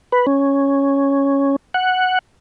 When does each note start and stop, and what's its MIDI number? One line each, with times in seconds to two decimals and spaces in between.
0.12 0.26 71
0.27 1.56 61
1.74 2.19 78